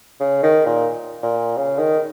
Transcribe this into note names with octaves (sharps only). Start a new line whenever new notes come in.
C#3
D#3
A#2
A#2
C#3
D#3